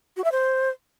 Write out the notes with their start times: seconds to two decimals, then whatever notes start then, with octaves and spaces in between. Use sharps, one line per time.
0.17 F#4
0.24 E5
0.32 C5